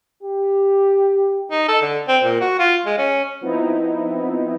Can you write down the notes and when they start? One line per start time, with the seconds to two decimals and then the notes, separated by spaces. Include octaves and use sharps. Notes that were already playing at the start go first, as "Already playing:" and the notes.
0.23 G4
1.51 D#4
1.68 A4
1.82 D3
2.08 C4
2.23 A#2
2.41 F#4
2.59 F4
2.86 G#3
2.98 C#4
3.41 F3 B3 C4 D#4 E4